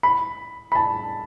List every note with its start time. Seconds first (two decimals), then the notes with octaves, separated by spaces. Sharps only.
0.03 B5
0.72 B5
0.75 A5